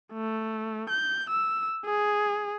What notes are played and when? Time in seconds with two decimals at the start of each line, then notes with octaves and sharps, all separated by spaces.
0.13 A3
0.90 G6
1.30 E6
1.85 G#4